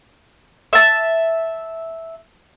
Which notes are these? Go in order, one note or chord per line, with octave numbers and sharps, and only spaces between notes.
E5 A5